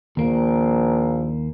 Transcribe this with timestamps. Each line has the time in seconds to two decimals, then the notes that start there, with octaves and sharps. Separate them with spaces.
0.17 A#1 D#2 A#3